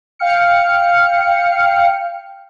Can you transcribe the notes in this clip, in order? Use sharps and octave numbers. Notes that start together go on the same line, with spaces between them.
F5 G5 F6 C#7